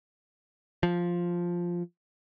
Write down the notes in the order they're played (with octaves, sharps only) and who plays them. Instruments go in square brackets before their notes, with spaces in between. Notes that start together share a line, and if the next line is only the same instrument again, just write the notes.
[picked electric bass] F3